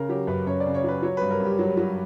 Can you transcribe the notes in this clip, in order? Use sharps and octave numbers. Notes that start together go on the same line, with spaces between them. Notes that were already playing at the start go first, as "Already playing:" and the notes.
Already playing: C#3 A#4
F#3 G4
F#2 B4
F#2 C#5
D5
C#3
C#5
F#3 B4
F#3 C#5
G2 B4
A#4
G2 G4
F#3
F#3